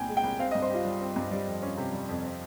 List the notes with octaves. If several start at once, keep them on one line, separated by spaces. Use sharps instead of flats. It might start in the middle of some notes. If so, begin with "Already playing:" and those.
Already playing: C2 A#2 C4 G5 G#5
G#3
G5
C2
C4 F5
D#5
G2
C5
F4 G4
G3
C4
G2
G3
F2
C#4
C3
G3
F2
C4